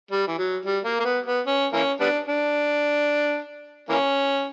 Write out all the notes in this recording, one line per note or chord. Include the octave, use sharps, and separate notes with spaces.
G3
E3
F#3
G3
A#3
A#3
B3
B3
C#4
E3 A#3 C#4
G3 B3 D4
D4
E3 A#3 C#4